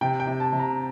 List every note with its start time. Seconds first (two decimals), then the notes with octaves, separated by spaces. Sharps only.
0.01 C3 G5
0.20 G5
0.27 C3
0.40 A5
0.53 C3
0.60 A#5